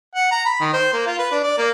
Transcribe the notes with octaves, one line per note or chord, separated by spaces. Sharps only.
F#5
A#5
B5
D#3
C5
A#3
F4
B4
D4
D5
A#3